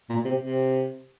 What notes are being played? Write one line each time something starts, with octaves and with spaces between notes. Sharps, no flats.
A#2
C3
C3